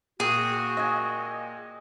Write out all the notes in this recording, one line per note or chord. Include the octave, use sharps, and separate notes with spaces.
A#2 F#4 G#4 G5
D#5 G#5